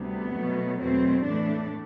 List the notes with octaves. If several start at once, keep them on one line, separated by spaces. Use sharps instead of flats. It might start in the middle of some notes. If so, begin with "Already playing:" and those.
Already playing: D2 C3 G3 B3
B2 F#3 A3
E2 B2 F#3 A3 C4
A2 E3 A3 D4